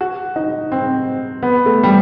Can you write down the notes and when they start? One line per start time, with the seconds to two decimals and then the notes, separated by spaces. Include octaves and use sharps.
0.01 F#4
0.36 D#4
0.72 C4
1.43 B3
1.66 A3
1.83 G3